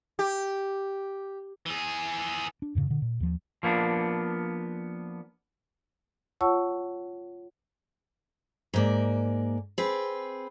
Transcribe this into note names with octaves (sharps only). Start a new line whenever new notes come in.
G4
E3 G#4
D4
F2 G#2 C#3
A#2 D3
A#2
D#2 F3
F3 A#3 B3 D4
F4 C#5 F#5 A5 C#6 E6
G#2 A#3 D5
C4 G#4 B4